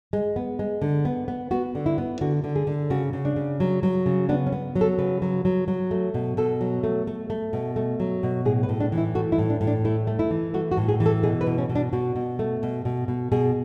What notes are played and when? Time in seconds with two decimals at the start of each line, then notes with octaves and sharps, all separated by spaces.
0.13 G#3
0.36 B3
0.59 G#3
0.82 D3
1.05 B3
1.28 B3
1.51 B3 F#4
1.75 D3
1.86 E4
1.98 B3
2.21 D3 F#4
2.44 D3
2.56 G#4
2.67 D3
2.90 C#3 F#4
3.13 C#3
3.25 D4
3.36 C#3
3.60 F#3
3.83 F#3
4.06 C#3
4.29 B3 D4
4.46 C#4
4.52 B3
4.75 F#3
4.81 A4
4.98 C#3 B4
5.22 F#3
5.45 F#3
5.68 F#3
5.91 A3
6.14 B2
6.37 B2 A4
6.61 F#3
6.83 A3
7.07 A3
7.30 A3
7.53 B2
7.76 A3
8.00 F#3
8.23 B2
8.45 A2 G#4
8.63 B4
8.69 A2
8.80 D4
8.92 E3
8.98 E4
9.15 A3 F#4
9.32 E4
9.38 A2
9.50 D4
9.61 A2
9.67 D4
9.85 A3 E4
10.07 A3
10.19 E4
10.31 E3
10.54 A3 F#4
10.71 F#4
10.77 A2
10.88 G#4
11.00 E3
11.06 A4
11.23 B2 G#4
11.41 B4
11.47 B2
11.58 C#4
11.69 B2
11.75 D4
11.93 B2 F#4
12.16 B2
12.39 A3
12.63 B2
12.85 B2
13.08 B2
13.32 B2 G#4